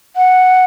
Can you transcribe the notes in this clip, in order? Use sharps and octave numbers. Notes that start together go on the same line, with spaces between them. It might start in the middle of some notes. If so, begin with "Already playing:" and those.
F#5